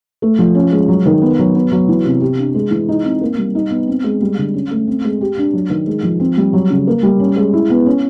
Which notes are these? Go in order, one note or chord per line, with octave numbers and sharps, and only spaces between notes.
A3
F3
C#4
G#3
F#3
D#3
B3
F#3
B3
F#3
E3
C3
G4
D4
G#3
E3
D#4
C4
A#3
G3
D#4
B3
C4
G#3
G3
D3
C#4
A3
C4
G#3
G4
D4
F#3
D#3
G#3
F3
C4
G3
F#3
C#3
A#3
G3
C#4
G#3
E4
B3
C#4